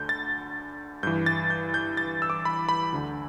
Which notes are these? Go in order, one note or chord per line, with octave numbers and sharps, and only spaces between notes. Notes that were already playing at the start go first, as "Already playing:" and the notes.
Already playing: D2 D3 G6
A6
G2 E3 G6
A6
G6
G6
A6
E6
D6
B5
B5
D2 D3